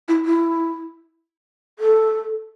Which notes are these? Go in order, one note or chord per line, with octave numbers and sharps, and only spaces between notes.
E4
E4
A4